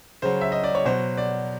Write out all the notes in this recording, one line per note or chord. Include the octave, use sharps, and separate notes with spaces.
C#3 F#3 C5
E5
D#5
D5
C#5
B2 F#3 C5
D5